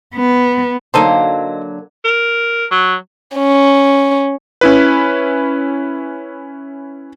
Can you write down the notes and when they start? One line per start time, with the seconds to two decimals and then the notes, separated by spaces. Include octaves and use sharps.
0.15 B3
0.94 D3 F#3 A#3 D#4 A4 C5
2.05 A#4
2.71 F#3
3.37 C#4
4.61 C#4 E4 B4